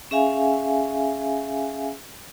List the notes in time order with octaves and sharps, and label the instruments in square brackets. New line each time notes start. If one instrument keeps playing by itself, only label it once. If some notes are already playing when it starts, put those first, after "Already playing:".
[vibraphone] C#4 G#4 E5 F5 G#5